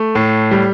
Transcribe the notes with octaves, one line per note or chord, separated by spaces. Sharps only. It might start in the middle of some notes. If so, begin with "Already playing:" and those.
Already playing: A3
A2
G3